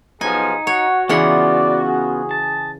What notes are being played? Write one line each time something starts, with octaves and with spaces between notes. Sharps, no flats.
B1 F3 B3 D#4 G#4 G#5
F#4 C#5 F#5
C#3 E3 B3 C#4 F4 D5 F#5
G#4
A5